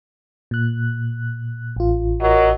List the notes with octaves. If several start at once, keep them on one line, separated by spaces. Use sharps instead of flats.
A#2 F#6
A1 F4
F#3 A#4 D#5